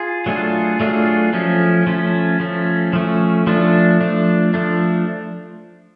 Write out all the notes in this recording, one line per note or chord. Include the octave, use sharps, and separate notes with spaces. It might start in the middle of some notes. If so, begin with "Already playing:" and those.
Already playing: F4 G#4
F#3 A3 D4 F4 G#4
F#3 A3 D4 F4 G#4
F3 A3 C#4
F3 A3 C#4
F3 A3 C#4
F3 A3 C#4
F3 A3 D4
F3 A3 D4
F3 A3 D4